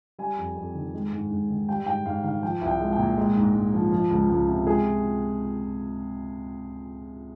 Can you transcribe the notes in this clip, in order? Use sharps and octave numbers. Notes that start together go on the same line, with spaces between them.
G3 G#5
F2
F2
D#3
G#3
G#2
G#2
D#3
G3 G5
G#2 G5
G#2 F5
D#3 F5
F3 G5
C2
G5
G#3
G5
A#2
G#3
G#2
G#2
F3
F3
C#2
C#2
C3
G#3 G#4